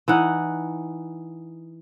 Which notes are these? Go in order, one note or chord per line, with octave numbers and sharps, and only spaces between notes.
E3 D#4 F#5